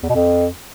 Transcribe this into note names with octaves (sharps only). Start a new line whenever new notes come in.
E2
B2
F2